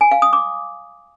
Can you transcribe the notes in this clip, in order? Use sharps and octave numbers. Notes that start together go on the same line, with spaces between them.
G#5
F5
D#6
D6